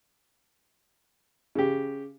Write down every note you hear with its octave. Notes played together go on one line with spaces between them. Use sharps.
C#3 G4